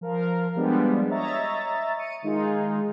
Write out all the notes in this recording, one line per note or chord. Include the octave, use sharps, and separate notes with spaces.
F3 A#4 F5
F3 G3 G#3 B3 D4
C#5 D#5 E5 A#5 A6
C#7 D#7
D#3 G#3 D#4 F4 G#4